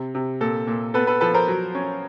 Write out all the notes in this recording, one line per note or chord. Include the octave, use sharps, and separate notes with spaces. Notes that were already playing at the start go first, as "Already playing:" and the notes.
Already playing: C3
C3
A#2 A4
A#2
B3 A4 B4
A4 B4
F3 A4 B4
A#4 C5
F#3
C#4